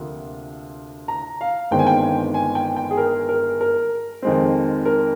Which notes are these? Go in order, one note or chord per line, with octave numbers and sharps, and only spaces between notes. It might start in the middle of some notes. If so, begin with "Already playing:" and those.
Already playing: D2 C3 F3 A#3
A#5
F5
G1 G2 D#3 G#3 C4 G5
G#5
G5
G#5
G5
G5
G#4
A#4
A#4
A#4
F2 D#3 G#3 C4
A#4